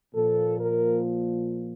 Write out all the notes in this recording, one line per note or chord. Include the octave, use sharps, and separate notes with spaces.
A#2 F3 A4
A#4